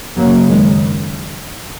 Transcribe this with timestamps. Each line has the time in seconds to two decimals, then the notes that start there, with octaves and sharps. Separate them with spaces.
0.18 F#1 F#2 C#3 F#3 A#3
0.49 D#3 G#3